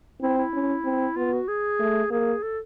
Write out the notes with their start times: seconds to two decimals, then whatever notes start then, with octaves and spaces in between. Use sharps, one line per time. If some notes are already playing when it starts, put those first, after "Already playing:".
0.21 C4 E4
0.38 E4
0.53 C#4
0.85 C4
1.16 B3 F4
1.32 F#4
1.48 G#4
1.80 A3
2.10 A#3 G#4
2.43 A4